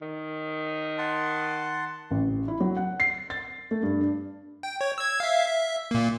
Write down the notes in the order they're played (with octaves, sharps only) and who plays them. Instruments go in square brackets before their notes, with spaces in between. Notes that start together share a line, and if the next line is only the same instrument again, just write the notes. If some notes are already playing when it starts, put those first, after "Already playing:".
[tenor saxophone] D#3
[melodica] F#5 A5 C6
[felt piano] A1
E4
F#3
F#5
C7
A6
A3
G2
D4
[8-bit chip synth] G5
C#5
E6 G#6
E5 F5
E5
A#2 A#3